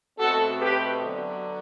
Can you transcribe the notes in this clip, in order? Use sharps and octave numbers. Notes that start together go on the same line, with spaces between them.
B2 A3 C4 F#4 A4
G4 B4
D3 F#3 B3